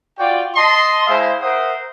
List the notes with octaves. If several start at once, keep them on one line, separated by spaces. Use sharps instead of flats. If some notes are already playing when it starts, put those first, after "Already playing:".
F4 F#4 D5 G5
D#5 A5 C6
G#3 E4 C5 E5 F5
A#4 C5 E5 F#5 D#6